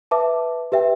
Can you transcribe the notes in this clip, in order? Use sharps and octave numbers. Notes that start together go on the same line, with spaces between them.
B4 E5 A5 D6
G4 B4 E5 G5